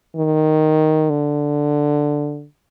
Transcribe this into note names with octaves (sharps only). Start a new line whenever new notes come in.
D#3
D3